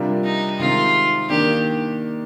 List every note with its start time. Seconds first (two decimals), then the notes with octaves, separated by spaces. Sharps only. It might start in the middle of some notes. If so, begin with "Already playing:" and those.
Already playing: C3 G3 D4 F4 A#4
0.24 D#4
0.59 C3 D#3 G#3 C4 D#4 F4
1.30 D#3 A#3 D4 G4